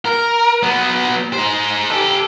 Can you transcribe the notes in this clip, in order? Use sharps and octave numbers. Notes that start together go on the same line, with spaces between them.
A#4
F#3 B3
D#4 C5
G4 A4